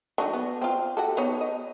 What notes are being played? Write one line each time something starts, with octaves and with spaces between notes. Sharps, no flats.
F#3 D4 D#4
B3
C4 F4
F#4 G4 A4
B3 D#4 C#5
D#5